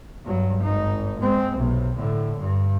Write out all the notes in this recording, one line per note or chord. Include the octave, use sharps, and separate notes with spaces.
G2 F#3
G#1 D#4
G#3 C4
B1 C3
A2 D3
G2